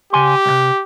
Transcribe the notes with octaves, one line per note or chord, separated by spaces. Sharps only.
C#3 G4 G#5 C6
C2 C3